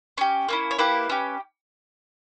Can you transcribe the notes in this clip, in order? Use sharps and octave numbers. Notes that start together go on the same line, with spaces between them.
C#4 G4
A#3 C#4 E4
C#5
A#3 E4 G4 B4
C#4 G4